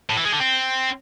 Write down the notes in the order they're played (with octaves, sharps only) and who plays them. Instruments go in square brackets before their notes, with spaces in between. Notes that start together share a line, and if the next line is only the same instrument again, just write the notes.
[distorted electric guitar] A2
E3
G#3
D3
C4